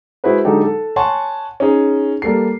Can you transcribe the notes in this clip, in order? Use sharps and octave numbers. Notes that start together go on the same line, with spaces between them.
G#3 E4 F#4 G#4 B4 C5
D3 F#3 G#3 D#4 G4 A4
A4
C#5 F#5 G#5 A5 C6 C#6
C#4 D#4 G#4
G3 A#3 A4 C7